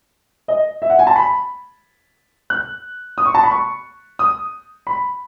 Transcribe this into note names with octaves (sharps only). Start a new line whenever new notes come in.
D#5
E5
F#5
G#5
A5
B5
F#6
D#6
C#6
A5
B5
C#6
D#6
B5